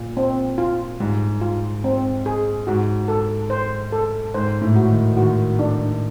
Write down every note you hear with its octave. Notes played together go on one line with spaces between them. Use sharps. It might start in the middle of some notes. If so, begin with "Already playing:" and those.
Already playing: A#2
C4
F4
G#2 G3
F4
C4
G#4
G#2 F#4
A4
C5
A4
G#2 C5
A2
F#4
D#3
D#3 F#4
D4